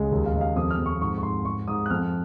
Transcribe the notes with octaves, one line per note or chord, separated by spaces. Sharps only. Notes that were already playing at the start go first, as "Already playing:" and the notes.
Already playing: C#2 G#3
D#2
F5
D#2 D#5
F5
F2 D#6
F6
F2
C#6
G#2 C#6
C#6
G#2 C6
G#2 C#6
G#2 D#6
F#6
F2 F6